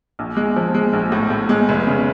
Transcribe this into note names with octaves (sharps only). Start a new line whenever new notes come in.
A#1
G#3
F3
G#3
A#1
A2
A2
G#3
F1
C#3